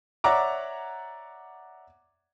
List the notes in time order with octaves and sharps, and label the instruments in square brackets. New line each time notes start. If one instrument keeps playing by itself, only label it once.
[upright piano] C#5 D5 E5 F#5 A#5 D6